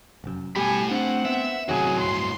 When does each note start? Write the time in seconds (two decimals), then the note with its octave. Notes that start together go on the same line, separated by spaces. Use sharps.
0.24 F1 F#2
0.56 B2 G3 A3 G4 G#5 B5
0.91 C4 D4 F#5
1.25 B3 E5
1.69 F#2 A2 C3 D#3 F#3 F#4 G#4
2.00 C#2 G2 C6